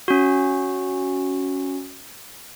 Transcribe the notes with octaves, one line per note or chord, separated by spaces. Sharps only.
C#4 F#4